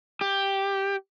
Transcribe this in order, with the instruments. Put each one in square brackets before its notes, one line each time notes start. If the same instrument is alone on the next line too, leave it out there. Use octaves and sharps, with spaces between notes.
[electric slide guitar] G4